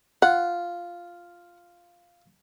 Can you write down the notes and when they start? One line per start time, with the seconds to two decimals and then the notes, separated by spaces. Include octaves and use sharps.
0.22 F4 F#5